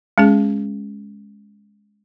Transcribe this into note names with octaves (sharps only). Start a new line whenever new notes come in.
G#3 C#4 G#4